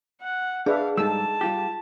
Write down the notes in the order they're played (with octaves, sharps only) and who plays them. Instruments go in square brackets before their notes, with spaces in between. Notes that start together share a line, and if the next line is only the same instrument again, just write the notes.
[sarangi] F#5
[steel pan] D4 B4 E5 [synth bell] G#4 [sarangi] F5
[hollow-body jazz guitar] G#2 G3 [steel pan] D#4 A4 E6 [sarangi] A5
[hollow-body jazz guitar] G3 F4 G4